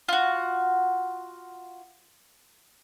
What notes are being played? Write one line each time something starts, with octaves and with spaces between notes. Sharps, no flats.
F4 F#4